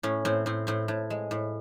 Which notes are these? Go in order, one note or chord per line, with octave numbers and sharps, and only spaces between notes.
A2 C#4
A2 C4
A2 C4
A2 C4
A2
G#3
A2